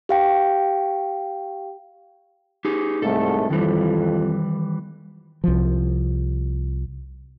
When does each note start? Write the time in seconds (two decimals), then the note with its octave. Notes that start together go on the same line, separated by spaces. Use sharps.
0.09 G4 F5 G5
2.65 D#4 G4 G#4
3.02 C2 G#2 A3 A4
3.50 F2 D#3 E3 G3
5.44 C2 F3